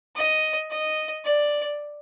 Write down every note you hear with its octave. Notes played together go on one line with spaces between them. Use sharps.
D#5
D#5
D5